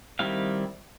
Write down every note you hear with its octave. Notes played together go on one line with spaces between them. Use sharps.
D#3 G3 C4 E4 F5